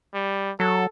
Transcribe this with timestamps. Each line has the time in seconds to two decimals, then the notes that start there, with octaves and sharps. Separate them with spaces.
0.14 G3
0.60 F#3 A4